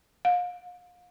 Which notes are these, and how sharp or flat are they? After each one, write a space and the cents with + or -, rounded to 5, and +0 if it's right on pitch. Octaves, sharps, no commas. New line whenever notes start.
F5 +35